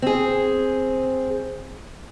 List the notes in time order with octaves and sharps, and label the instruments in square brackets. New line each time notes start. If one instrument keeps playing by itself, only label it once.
[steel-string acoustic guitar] C4 G#4